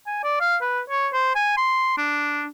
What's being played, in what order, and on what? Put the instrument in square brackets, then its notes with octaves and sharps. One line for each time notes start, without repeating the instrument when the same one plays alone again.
[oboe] G#5
D5
F5
B4
C#5
C5
G#5
C6
D4